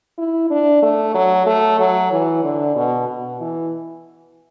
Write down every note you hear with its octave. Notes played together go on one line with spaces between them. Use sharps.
E4
D4
A3
F#3
A3
F#3
E3
D3
B2
B2
E3